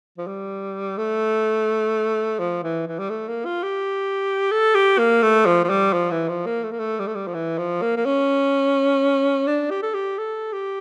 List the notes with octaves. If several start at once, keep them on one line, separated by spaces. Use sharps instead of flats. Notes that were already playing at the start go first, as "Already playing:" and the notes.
F3
G3
A3
F3
E3
E3
G3
A3
A#3
F4
G4
A4
G4
A#3
A3
F3
F3
G3
F3
E3
F3
A#3
A3
A#3
A3
G3
A3
G3
F3
E3
F3
A#3
A#3
C#4
D4
G4
A4
G4
A4
G4